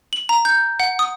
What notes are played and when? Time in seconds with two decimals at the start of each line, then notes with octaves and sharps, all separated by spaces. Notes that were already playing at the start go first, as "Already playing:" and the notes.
0.13 F#7
0.29 A#5
0.45 G6
0.80 F#5
0.99 D#6